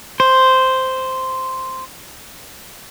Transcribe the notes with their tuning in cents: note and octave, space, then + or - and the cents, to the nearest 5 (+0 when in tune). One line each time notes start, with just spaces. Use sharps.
C5 -5